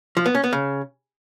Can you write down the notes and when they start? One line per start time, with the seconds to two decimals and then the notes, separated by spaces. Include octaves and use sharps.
0.17 F3
0.26 B3
0.35 C#4
0.44 B3
0.53 C#3